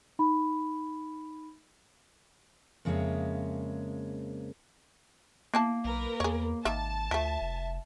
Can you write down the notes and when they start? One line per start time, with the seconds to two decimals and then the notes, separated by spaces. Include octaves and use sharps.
0.19 D#4 B5
2.85 F2 C#3 G#3 A#3 C#5 E5
5.54 A#3 B3 E4 A5
5.85 B1 A#4 B4
6.20 E2 G#4 C#5
6.65 G#1 D#3 A#3 E5 A5
7.11 D2 F3 A3 E5
7.41 F1